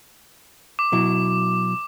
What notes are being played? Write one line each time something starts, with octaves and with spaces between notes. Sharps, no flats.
D6
B2 F#3 E4